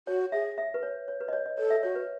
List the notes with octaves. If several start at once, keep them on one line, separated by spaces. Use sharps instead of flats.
F#4 C#5
G#4 E5
E5
B4
C#5
C#5
B4
D#5
C#5
D#5
A4 C#5
E5
F#4 C#5
B4